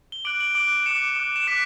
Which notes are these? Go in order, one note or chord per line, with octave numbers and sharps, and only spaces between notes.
G7
D6 F#6 D7 F#7
D7 F#7
D6 F#6 D7 F#7
D6 F#6 C#7 E7
D6 F#6
E7
D6 F#6 B6 D7